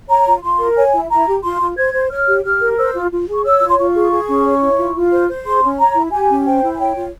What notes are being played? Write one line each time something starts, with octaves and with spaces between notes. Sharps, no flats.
C#5 A#5
F4
F4 C6
A#4
C#5 G#5
E4
E4 A#5
G4
F4 C6
F4
C5 G#6
C5
C#5 F6
G4
G4 F6
A#4
C5 E6
F4
F4
G#4
C#6
C#5 E6
F4
C6
F4 C#6
G#4
G#4
C#4
C#5
E4
F4
F4
C5
C5
G#4 C6
C#4
C#5 A#5
E4
G4 G#5
C#4
C5 G5
E4
G#5
C#5 G5
F4